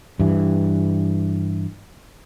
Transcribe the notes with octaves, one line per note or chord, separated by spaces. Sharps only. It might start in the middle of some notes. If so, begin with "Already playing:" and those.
G2 E3